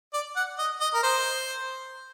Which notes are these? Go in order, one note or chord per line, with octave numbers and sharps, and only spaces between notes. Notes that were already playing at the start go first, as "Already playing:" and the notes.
D5
F#5
D#5
D#5
A#4
C5